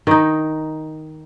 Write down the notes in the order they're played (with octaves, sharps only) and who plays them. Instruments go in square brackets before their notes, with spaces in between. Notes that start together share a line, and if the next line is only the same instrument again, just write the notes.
[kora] D#3 D#4